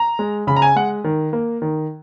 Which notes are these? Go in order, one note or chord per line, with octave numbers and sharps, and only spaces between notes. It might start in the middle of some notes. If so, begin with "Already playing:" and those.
Already playing: A#5
G#3
C#3 B5
A#5
G#5
G#3 F#5
D#3
A#3
D#3